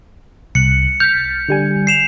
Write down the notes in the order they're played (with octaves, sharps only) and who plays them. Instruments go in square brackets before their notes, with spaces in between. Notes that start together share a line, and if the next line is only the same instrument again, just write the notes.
[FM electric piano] C2 F#6 [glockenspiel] C#7
[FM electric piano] F6 A6 B6 [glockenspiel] G6
[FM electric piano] D3 G3 G#5
[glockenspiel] C7 E7 F7